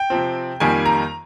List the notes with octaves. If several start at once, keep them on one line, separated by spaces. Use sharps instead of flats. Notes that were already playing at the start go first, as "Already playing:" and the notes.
Already playing: G5
C3 F3 C4
F2 D#3 G3 A#3 G#5
A#5